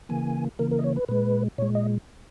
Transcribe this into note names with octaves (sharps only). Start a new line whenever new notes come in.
C#3 E3 A#3 G#5
C#3 E3 A#3 A#4
A#4
D#5
C#5
B4
A#2 G#3 B4
A#2 G#3 C#5
D#5